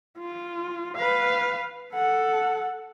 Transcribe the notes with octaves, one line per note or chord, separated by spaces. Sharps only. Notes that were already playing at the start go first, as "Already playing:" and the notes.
F4
B4 F5
A4 F#5